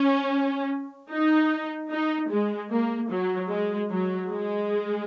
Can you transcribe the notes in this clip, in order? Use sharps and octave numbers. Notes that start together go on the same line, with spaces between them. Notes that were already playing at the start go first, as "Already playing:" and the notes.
Already playing: C#4
D#4
D#4
G#3
A#3
F#3
G#3
F#3
G#3